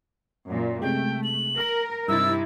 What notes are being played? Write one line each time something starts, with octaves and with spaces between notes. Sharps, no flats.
F#2 A#2
C3 G#3 A3 G5
F#7
A#4 A#5 F6
G2 C3 D#4 E4 E6 A6